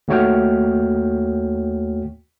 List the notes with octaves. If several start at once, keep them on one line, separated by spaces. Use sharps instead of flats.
D#2 A3 F#4 C#5 G5 F6